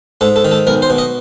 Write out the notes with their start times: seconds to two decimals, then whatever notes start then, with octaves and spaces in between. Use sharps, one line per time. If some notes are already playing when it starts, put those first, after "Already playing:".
0.21 G#2 A4
0.36 A4
0.44 D#3
0.52 A4
0.67 B1 A#4
0.82 C5
0.90 B2
0.98 D#5